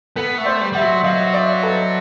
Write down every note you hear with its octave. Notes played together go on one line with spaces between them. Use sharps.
B3 A4 B4
A3
C5 D5
G3
G3 E5 F#5
F#3
F#3 D#5 F5
D5 E5
A4 B4